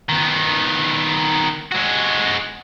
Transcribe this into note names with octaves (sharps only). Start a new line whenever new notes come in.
D#3 B3
G#3 F#4